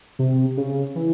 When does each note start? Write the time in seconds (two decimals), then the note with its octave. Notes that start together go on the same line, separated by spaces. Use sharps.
0.19 C3
0.57 C#3
0.95 E3